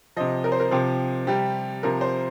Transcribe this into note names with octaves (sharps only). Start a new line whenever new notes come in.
C3 F3 D#5
A#4
C5
A#4
C3 F3 G4
C3 G3 G4
C3 F3 A#4
C5